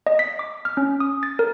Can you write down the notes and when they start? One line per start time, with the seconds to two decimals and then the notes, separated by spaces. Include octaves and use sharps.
0.07 D#5
0.19 B6
0.39 D6
0.65 F6
0.77 C#4
1.00 D#6
1.23 A6
1.39 A#4